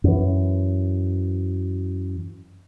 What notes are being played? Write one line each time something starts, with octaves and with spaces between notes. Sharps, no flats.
F#2 E3